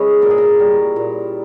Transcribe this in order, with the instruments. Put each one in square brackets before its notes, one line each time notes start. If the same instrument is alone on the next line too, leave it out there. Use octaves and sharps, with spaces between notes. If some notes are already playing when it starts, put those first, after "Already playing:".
Already playing: [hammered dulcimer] C#3 G#3 E4 G#4 B4 C#5
A#2 A#4
G#4
A#4
G3
A#2